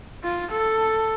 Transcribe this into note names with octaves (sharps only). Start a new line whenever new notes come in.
F4
A4